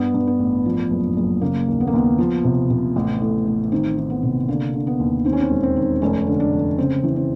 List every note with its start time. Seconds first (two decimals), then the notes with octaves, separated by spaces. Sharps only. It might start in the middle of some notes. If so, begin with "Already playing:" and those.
Already playing: G2 B3
0.14 G2
0.27 B3
0.39 A1
0.66 F3
0.90 F#1
1.17 F#1
1.41 C#3 A#3
1.68 D#2
1.80 B3
1.87 A#3
1.93 D#2 B3
2.18 F3
2.44 C3
2.70 C3
2.96 A1
3.21 A2
3.47 A1
3.72 D#3 C4
3.97 D#3
4.10 B3
4.23 C3
4.48 D3 A#3
4.74 D3
4.87 B3
5.00 D#2
5.25 D#3 C4
5.33 C#4
5.41 C4
5.50 E1
5.63 C4
5.76 D#3
6.02 F1 C#4
6.27 D3
6.40 D4
6.53 F1
6.78 C#3 C4
7.04 E3
7.16 C4